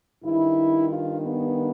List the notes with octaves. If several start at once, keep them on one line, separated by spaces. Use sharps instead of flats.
G2 D#3 E4
F4
B3